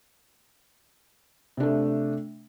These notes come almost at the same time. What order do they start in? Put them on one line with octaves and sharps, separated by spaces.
C3 D4 A3